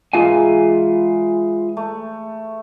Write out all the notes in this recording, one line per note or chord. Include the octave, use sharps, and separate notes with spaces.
G#2 E3 G#3 F4 F5 G#5
A3